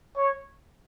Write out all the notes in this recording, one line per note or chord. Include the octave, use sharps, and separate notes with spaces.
C#5